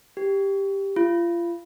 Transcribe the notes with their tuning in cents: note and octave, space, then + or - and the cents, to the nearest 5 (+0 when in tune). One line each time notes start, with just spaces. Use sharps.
G4 +5
F4 -30